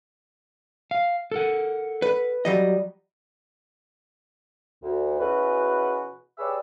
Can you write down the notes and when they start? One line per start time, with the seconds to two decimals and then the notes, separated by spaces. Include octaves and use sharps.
0.91 F5
1.31 A4 A#4 F#5
2.02 B4
2.45 F#3 G3 D#5
4.83 D2
5.19 B2 E3 C#4 F#4 G#4 B4
6.38 G4 G#4 B4 C#5 D5 E6